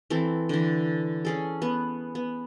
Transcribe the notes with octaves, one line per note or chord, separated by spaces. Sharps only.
E3 C4 A4
D3 E3
C#4 G#4 A4
B3
B3